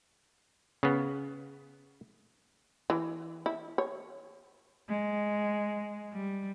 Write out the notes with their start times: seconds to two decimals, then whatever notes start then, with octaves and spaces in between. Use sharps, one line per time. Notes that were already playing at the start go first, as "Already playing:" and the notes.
0.83 C#3 B3
2.90 E3
3.46 E4
3.78 C#5
4.88 G#3
6.13 G3